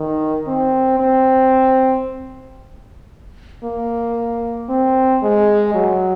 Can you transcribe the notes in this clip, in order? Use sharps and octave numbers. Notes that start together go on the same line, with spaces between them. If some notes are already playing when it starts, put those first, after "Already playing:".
Already playing: D#3
C4
C4
A#3
C4
G#3
F#3